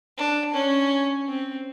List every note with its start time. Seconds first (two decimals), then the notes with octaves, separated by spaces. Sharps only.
0.18 D4
0.54 C#4
1.28 C4